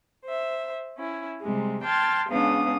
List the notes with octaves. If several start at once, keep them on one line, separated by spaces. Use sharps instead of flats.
C5 E5
C#4 E4
C3 G3 G#3
G5 A5 C6 F6 G#6 A6
G#2 C#3 B3 D4 F5 D#6